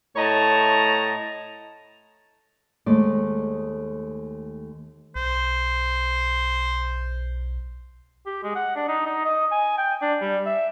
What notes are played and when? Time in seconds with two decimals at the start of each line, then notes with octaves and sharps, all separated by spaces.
0.16 A2 A3 C#5 D#5 A5 A#5
2.86 D#2 G#3 A3 D5
5.15 B1 C5
8.26 G4
8.44 G#3
8.55 F#5
8.76 D4
8.88 D#4
9.06 D#4
9.25 D#5
9.52 G#5
9.78 G5
10.02 D4
10.21 G3
10.46 E5